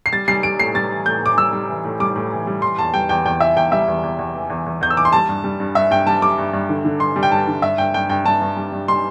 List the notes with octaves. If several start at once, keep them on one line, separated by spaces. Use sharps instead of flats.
C7
G3 A6
G3 C7
G3 D7
A2 C7
G3 A6
E3
A2 G6
A2 D6
G3 E6
G3
E3
A2
G3 D6
A2
E3
G3
E3 C6
E2 A5
G3 G5
E2 G5
E2 G5
E3 E5
E2 G5
G3 E5
E2
E2
E2
E3
E2
E2
E2 G6
E6
E3 D6
C6
G3 A5
G2
G3
G2
G2 E5
G2 G5
G3 A5
G3 D6
G2
G2
D3
D3
G2 C6
G3
G5
G2 A5
D3
G2 E5
G2 G5
G2 G5
G2 G5
G2 A5
G2
G3
G2
G3 C6